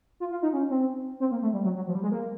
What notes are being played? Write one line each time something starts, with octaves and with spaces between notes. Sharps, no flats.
F4
F4
D#4
C#4
C4
C4
A#3
A3
G3
F#3
F#3
F3
G3
G#3
A#3